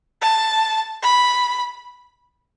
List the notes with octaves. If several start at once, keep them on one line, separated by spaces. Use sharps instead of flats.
A5
B5